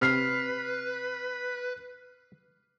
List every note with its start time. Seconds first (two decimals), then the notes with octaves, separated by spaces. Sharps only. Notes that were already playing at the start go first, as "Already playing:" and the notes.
0.02 C3 B4 F6 C7